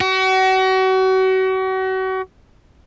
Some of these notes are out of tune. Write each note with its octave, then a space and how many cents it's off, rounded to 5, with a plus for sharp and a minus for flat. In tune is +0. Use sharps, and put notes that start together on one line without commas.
F#4 +35